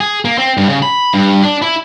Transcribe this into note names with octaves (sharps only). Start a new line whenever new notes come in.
G#4
A#3
C4
G2
C#3
B5
G2
D4
E4